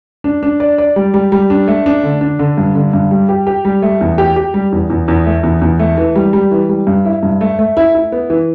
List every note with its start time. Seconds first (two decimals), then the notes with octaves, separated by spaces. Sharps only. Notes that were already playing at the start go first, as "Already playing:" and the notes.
0.24 D4
0.43 D4
0.60 D5
0.78 D5
0.96 G3
1.14 G3
1.32 G3
1.50 D4
1.68 A3
1.86 D4
2.03 D3
2.21 D4
2.39 D3
2.58 G2
2.75 D3
2.93 G2
3.11 G3
3.29 G4
3.47 G4
3.65 G3
3.82 A3
4.01 E2
4.18 G4
4.36 G4
4.54 G3
4.72 E2
4.90 E2
5.08 E2
5.26 A3
5.43 E2
5.61 E2
5.79 A3
5.98 E3
6.15 G3
6.33 G3
6.51 E3
6.69 G3
6.87 G2
7.05 E4
7.23 G2
7.41 A3
7.59 A3
7.77 E4
7.95 E4
8.12 B3
8.30 E3